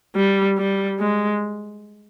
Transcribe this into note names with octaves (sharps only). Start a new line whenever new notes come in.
G3
G3
G#3